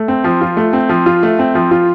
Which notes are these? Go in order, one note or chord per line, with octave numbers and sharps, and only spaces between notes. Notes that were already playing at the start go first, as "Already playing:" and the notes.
Already playing: A3
C4
F3
F4
A3
C4
F3
F4
A3
C4
F3
F4